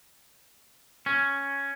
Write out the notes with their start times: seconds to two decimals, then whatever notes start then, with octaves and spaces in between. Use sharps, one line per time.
1.06 C#4